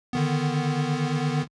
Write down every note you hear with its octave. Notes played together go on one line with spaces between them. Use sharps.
D3 D#3 B3